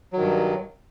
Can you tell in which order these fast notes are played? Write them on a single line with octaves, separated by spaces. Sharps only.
F#3 D#3 G2